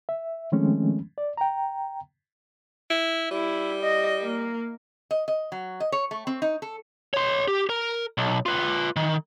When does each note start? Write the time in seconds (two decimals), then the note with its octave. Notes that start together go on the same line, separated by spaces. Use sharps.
0.09 E5
0.52 D#3 F3 G#3 A3 C4 C#4
1.18 D5
1.37 G5 A#5
2.90 E4
3.31 G3 E4
3.83 D#5
4.22 A#3
5.11 D#5
5.28 D#5
5.52 F#3
5.80 D#5
5.92 C#5
6.11 A3
6.27 C4
6.42 D#4
6.62 A4
7.14 C#5 C6
7.48 G4
7.69 A#4
8.18 B1
8.46 F4 B4
8.96 D#3